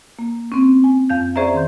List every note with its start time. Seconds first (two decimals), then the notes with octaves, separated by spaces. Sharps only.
0.19 A#3
0.52 C4 C#4
0.84 G#5
1.09 F2 F5 G6
1.36 C#4 G#4 C5 D5 E5 A#5
1.54 D#3 C6 G6